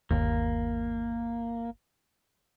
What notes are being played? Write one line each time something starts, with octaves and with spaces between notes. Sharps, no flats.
G1 D#2 A#3